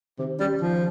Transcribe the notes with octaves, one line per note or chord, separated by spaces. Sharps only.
C3 D#3
G3 C#4
D#3 F3